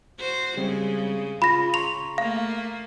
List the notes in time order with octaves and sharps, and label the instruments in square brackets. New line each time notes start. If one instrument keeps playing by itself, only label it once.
[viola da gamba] F#4 C5
[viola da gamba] C#3 G#3 [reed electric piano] G3 C4
[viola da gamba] C#3 [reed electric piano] F4 [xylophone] B5 A#6
[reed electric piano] A#5 C6 C#6 [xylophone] F7
[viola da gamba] A3 A#3 [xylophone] F5